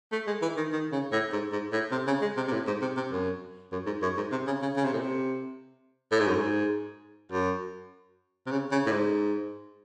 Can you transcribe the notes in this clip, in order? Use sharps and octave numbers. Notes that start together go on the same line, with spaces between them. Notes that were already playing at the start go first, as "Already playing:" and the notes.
A3
G#3
E3
D#3
D#3
C#3
A2
G#2
G#2
A2
C3
C#3
G#3
C3
C3
A2
G#2
C3
C3
F#2
F#2
G#2
F#2
G#2
C3
C#3
C#3
C#3
C3
A2
C3
A2
G#2
F#2
G#2
F#2
C3
C#3
C#3
A2
G#2